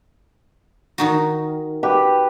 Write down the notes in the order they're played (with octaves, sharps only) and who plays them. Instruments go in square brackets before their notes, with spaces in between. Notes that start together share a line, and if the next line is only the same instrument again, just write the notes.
[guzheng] D#3 D#4 F#4
[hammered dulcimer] G4 B4